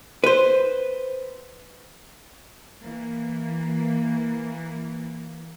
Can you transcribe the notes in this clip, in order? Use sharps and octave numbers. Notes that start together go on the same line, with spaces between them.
B4 C5
E3 A#3